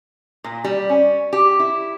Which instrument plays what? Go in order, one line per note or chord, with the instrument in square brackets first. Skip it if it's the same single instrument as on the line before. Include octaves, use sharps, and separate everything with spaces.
[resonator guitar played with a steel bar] A#2
G3
C#4
G4
E4